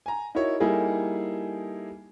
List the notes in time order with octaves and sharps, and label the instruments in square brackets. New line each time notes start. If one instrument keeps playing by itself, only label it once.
[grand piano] G#5 A#5
D#4 E4 F#4 A#4 C#5
G3 A#3 D#4 E4 G#4 A4